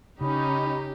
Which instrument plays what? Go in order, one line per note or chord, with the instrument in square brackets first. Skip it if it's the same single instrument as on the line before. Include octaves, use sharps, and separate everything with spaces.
[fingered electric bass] C#3 [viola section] C#4 D#4 [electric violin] G4 [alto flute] B5